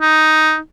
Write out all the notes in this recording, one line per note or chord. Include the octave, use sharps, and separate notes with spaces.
D#4